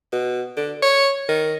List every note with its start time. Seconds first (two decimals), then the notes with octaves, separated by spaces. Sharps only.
0.13 B2
0.57 D3
0.82 C#5
1.29 D#3